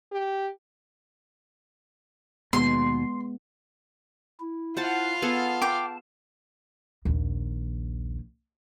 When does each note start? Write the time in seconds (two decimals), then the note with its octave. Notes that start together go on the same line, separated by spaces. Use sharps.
0.11 G4
2.53 D#2 B2 G#3 B3 C6
4.40 E4
4.77 F4 C5 F5 F#5 A5
5.22 B3 G#4 A4 A5
5.62 G5 D6
7.05 A#1 D#2